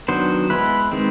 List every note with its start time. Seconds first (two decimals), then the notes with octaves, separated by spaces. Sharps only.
0.08 D#3 F#3 B3 D4 C5
0.50 G#3 B3 E4 B4
0.92 D#3 G#3 C4